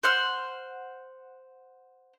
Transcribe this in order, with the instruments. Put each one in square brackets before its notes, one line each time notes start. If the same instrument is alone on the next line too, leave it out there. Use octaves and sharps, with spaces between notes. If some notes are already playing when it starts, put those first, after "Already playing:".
[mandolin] C5 F#5 F6